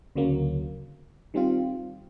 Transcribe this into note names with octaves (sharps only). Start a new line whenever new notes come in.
D2 C#3 F#3 A#3
D#3 G3 C4 F4